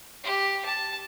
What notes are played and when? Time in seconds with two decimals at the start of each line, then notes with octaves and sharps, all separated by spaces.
0.24 G4
0.65 A5